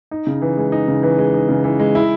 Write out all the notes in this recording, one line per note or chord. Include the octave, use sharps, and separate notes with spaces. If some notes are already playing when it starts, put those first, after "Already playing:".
D#4
C#3
E3
G#3
D#4
C#3
E3
G#3
D#4
C#3
E3
G#3
E4